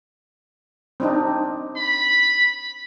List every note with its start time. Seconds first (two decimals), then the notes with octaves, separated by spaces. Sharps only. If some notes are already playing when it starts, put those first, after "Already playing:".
1.00 C4 D4 D#4
1.77 B5